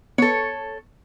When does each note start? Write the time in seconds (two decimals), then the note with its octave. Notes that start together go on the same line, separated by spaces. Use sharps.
0.18 B3 A4 C#5